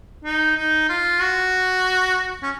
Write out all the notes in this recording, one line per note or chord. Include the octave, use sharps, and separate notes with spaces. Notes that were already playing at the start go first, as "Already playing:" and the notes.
D#4
D#4
F4
F#4
C#4